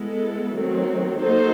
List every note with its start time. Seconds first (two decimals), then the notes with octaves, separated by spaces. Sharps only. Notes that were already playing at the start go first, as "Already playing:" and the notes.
Already playing: G#3 B3 E4 A4
0.54 D#3 F#3 A3 C4
1.20 A#3 D#4 F#4 A4 C5